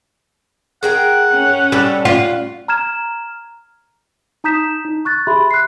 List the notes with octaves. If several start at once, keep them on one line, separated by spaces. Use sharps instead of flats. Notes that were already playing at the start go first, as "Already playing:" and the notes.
G#4 A#4 F#5 G5
C#4
G3 A4 A5
F4 F#5
A#5 F6 G#6 E7
D#4 A#5 D#6 G6 B6 E7
D#4
C#6 F#6 A6
G4 G#4 E5 B5 C6
F#6 C7